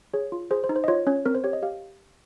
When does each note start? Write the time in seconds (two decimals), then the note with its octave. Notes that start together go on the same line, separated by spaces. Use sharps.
0.14 G#4 C#5
0.32 F4
0.51 G#4 C5
0.64 C5
0.69 D#4
0.76 C5
0.84 D#5
0.88 F4 C#5
1.07 C#4 C#5
1.25 C4 A#4
1.35 C5
1.44 G4 C#5
1.53 D#5
1.62 G4 F5